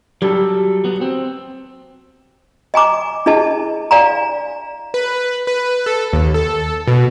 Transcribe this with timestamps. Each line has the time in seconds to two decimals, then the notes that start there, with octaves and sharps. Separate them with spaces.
0.22 F#3 G3 A4
0.84 F#3 B3
1.01 C4
2.74 D#5 G#5 A#5 D6
3.26 D4 E4 G#4 D#5 A5
3.91 D5 F5 G#5 A#5
4.94 B4
5.47 B4
5.86 A4
6.13 D#2
6.34 A4
6.87 B2